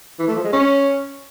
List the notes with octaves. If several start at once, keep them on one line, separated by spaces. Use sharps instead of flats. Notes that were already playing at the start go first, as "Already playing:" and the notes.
E3
A3
F3
G#3
C#4